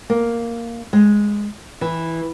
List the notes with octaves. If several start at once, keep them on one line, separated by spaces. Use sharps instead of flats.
A#3
G#3
E3